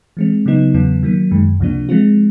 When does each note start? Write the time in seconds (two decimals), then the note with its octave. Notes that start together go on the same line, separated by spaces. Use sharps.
0.17 E3 G#3 C4
0.46 C#3 F#3 B3 D#4
0.74 E2 C#3 F#3 B3
1.03 D#3 F#3 A#3
1.31 F#2 D#3 G#3
1.60 C#2 C3 F3 A#3 D4
1.89 F3 G#3 C4 F4